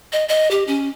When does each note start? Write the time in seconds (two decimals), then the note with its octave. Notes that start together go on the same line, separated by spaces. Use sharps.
0.12 D#5
0.29 D#5
0.51 G4
0.67 C#4